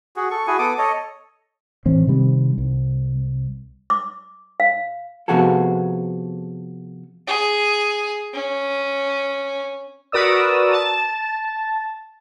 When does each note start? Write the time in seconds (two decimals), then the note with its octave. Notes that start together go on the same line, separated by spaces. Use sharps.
0.16 F#4 G#4
0.31 A4 C#6
0.47 E4 F#4 G#4 G#5
0.59 B3 A4 D6 D#6
0.78 A4 C#5 D#5
1.86 A2 E3 C4 C#4
2.07 C3 D#3 G3 C4
2.58 C2
3.90 D6
4.60 F5
5.28 C3 F3 B3 F#4 G#4 A4
7.28 G#4
8.34 C#4
10.12 F#4 A#4 B4 D5 D#6 E6
10.72 A5